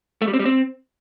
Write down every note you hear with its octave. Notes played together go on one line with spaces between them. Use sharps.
A3
G3
C4
G3
C4